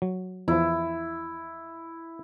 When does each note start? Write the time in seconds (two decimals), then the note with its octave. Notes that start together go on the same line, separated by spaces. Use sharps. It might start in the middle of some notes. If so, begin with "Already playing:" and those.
0.02 F#3
0.48 E2 F3 E4